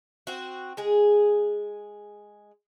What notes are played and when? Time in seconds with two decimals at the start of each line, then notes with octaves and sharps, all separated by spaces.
0.27 C4 F#4
0.77 G#3 G#4